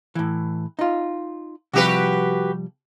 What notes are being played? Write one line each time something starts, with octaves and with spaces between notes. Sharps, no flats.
A2 E3
D#4 F4
C3 F3 G3 F#4 G4 B4